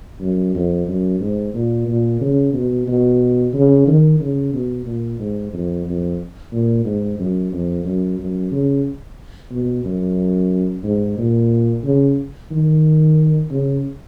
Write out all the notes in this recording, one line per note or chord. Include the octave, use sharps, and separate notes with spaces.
F#2
F2
F#2
G#2
A#2
A#2
C#3
B2
B2
C#3
D#3
C#3
B2
A#2
G#2
F2
F2
A#2
G#2
F#2
F2
F#2
F#2
C#3
B2
F#2
G#2
A#2
C#3
D#3
C#3